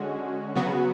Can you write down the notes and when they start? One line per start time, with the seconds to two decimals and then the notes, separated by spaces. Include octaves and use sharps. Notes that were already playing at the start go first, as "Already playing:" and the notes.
Already playing: D3 G#3 C#4 F#4
0.56 C#3 F#3 B3 F#4